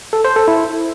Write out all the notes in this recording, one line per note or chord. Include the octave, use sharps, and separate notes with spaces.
A4
C5
A4
E4